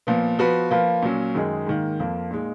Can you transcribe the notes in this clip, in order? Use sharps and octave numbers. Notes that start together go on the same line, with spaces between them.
A#2 F3 B3
F3 B3 F#4 B4
F3 A#3 F4 B4
A#2 F#3 C#4
F#2 D#3 G#3 D#4 G#4
G#2 D#3 A#3
F2 F3 A#3
A#2 G#3 D#4